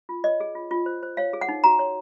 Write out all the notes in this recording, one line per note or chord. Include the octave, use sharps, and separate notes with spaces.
F4
C#5 D#5
G#4
F4
F4
C5
C5
C#5 F5
G#4
F#5
D#4
F#4 A#5
C#5